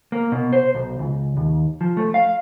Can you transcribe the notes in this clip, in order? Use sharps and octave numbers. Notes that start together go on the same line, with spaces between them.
A#3
B2
C5
B1
C#2
D#2
F3
A3
F5